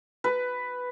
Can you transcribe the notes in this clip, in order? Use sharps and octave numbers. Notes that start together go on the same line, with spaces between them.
B4